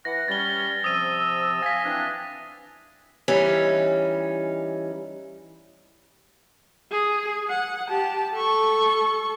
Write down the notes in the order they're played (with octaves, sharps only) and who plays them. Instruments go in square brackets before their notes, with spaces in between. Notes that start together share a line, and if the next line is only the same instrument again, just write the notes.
[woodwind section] E3 B4 F#5 [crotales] A#6
[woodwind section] G3 C#4 [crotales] A6 G7
[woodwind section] C3 F3 E6 [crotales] D#6 D#7
[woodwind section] F5 G#5 [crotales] A#6 B6
[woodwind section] E3 C4 D4
[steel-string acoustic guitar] E3 G3 C#4 D#4
[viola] G#4
F#5
G4 A5
A4 C#6